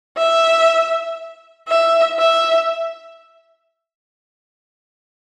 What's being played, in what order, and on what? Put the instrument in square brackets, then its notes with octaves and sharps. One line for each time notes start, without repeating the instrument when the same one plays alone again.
[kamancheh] E5
E5
E5